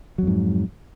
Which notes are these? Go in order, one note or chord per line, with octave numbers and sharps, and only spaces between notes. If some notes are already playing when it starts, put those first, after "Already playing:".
F2 G#2 F#3